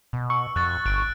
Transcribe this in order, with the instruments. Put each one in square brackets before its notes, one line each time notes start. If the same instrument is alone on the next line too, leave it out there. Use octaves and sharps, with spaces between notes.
[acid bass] B2
[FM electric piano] C#6 [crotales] E6
[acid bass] F2 [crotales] F#6 A6
[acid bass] G1 [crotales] F#6 D7